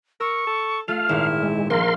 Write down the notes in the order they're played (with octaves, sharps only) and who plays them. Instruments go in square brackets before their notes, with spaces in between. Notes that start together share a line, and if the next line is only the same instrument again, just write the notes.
[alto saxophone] A#4 [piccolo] C#6 [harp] E6
[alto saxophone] A4
[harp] A3 [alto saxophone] F4 [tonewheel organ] F5 [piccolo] F6
[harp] G#1 A#2 [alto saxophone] E4
[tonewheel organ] G#3
[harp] A#1 [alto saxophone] A#3 [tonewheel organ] A#4 C6 [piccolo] F5